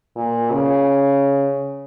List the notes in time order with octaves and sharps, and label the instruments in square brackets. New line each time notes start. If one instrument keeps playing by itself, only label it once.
[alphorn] A#2
C#3